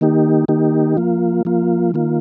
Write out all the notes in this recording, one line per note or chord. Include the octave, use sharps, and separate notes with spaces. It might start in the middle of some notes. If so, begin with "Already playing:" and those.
D#3 A#3 D#4 G4
D#3 A#3 D#4 G4
F3 A#3 F4
F3 A#3 F4
D#3 A#3 F4